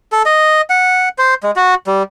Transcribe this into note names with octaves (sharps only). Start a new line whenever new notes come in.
A4
D#5
F#5
C5
G#3
F#4
G3